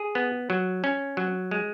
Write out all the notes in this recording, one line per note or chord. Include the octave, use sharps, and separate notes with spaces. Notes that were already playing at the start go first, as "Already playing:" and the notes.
Already playing: G#4
B3
F#3
C#4
F#3
G#3